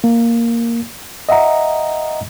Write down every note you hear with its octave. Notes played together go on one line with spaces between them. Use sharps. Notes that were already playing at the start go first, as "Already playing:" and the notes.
A#3
D#5 E5 F#5 A#5